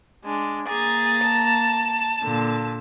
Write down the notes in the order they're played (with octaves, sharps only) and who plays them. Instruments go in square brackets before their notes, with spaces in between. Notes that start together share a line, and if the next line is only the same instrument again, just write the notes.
[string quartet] G#3 D4
[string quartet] A#3 A#5 A6 [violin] G#4
[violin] A5
[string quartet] A#2 D3